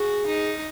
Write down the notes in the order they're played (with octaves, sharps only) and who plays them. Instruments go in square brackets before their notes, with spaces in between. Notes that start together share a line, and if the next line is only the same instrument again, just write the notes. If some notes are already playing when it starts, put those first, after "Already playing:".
Already playing: [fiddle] F#4 [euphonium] G#4
[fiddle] D#4